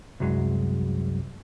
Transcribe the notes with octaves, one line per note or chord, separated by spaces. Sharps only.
C2 F#2 F#3 G#3